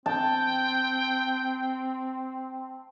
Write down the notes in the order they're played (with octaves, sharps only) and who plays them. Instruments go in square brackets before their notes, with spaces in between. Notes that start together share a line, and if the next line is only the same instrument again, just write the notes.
[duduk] C4 [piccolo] G5 [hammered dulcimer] A5